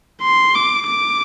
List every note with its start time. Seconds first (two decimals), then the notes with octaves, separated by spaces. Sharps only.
0.22 C6
0.55 D6
0.87 D6